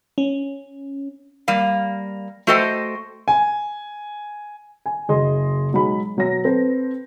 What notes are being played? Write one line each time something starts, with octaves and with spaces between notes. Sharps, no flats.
C#4
G3 A#3 F5
A3 F#4 A4 C5 D#5 G5
G#5
G#5
F#1 F#3 G#4 D#5 C6
B1 F#3 G#3 B5
B2 F#3 C#5 A#6
C4 A4 B4 C5